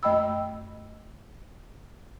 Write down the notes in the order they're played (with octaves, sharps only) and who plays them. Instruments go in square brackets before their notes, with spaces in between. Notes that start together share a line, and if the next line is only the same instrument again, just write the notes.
[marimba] F#2 A3 D#5 G5 B5 E6